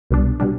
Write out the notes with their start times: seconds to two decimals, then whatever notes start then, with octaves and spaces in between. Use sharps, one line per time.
0.11 C2 B2 G3 D4
0.40 B2 G3 D4